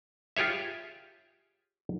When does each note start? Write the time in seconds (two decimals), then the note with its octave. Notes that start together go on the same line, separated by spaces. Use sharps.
0.36 F4 G4 G#4 C#5 E5